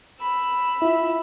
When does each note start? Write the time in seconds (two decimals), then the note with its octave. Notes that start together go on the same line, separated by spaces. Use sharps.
0.21 B5 E6
0.82 E4 F4 E5